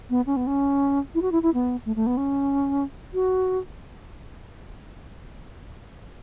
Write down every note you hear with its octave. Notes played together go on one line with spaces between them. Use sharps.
B3
C#4
B3
C#4
E4
F#4
E4
E4
B3
A3
A3
B3
C#4
F#4